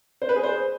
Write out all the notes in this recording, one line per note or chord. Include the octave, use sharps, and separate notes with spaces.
C5
B4
G#4
C5